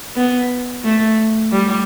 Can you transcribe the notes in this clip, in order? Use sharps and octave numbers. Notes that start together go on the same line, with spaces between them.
B3
A3
G3